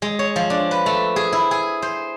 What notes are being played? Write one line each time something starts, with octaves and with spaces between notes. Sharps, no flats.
G#3
C#5
F3
D4
B4
A3
G#4
E4
G#4
C5